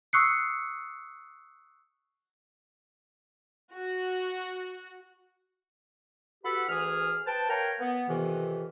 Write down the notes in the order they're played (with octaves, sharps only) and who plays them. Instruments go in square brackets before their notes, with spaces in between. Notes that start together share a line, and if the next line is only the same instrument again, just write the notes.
[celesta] C#6 D#6 E6 F#6 C7 C#7
[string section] F#4
[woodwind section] F#4 G4 A4 B4 F#5 B5
D2 E3 G#4 F6
B4 C5 G5 A5
A#4 B4 C#5 F5 G5 A#5
B3
F2 C3 D#3 E3